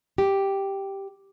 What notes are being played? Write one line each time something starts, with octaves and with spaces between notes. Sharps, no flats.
G4